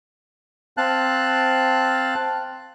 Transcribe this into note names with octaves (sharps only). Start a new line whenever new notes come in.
C4 F5 A5 F#6